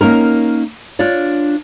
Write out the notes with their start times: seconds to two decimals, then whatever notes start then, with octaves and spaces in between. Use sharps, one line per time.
0.01 A#3 C#4 D#4 A#4
0.99 D4 F4 C#5 D5